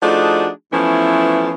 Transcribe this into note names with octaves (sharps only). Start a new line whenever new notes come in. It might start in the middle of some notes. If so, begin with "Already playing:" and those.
F3 A3 D4 D#4 F#4 G#4
E3 F3 A3 B3 C#4 E4